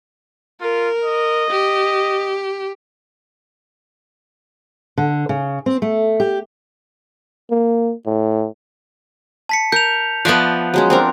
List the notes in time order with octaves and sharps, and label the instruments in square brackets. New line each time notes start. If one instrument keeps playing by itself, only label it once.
[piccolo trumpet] F4 [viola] A#4
[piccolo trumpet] D#5
[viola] G4
[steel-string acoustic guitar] D3
C#3
C4
A3
G4
[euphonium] A#3
A2
[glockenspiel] A5 B6 C#7
[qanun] A#4 [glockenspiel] G6 F7
[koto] F3 B3 [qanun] D5 E5 A5 [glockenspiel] F#6
[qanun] F#3 G#3 C#4
C4 D4 A#4